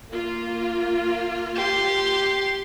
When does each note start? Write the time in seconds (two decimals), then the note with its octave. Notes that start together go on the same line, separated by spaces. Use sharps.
0.10 A#3 F4
1.56 G4 C6